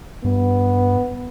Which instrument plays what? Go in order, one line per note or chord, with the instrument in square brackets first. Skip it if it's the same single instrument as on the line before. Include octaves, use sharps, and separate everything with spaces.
[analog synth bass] G2 [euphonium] B3